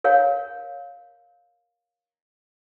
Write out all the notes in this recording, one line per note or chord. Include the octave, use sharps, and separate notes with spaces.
A#4 C#5 F5